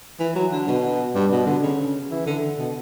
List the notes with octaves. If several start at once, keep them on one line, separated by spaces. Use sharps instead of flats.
E3
F#3
D3
B2
G2
B2
D3
C#3
E3
D3
B2